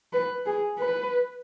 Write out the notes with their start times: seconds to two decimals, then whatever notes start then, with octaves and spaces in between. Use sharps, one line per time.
0.13 B4
0.46 G#4
0.78 B4